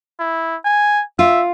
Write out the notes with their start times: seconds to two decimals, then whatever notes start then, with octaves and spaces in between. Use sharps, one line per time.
0.20 E4
0.65 G#5
1.19 F4 E5